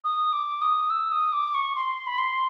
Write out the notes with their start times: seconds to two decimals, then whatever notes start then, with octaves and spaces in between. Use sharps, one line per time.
0.04 D#6
0.32 D6
0.61 D#6
0.90 E6
1.11 D#6
1.33 D6
1.54 C#6
1.75 C6
2.07 B5
2.18 C6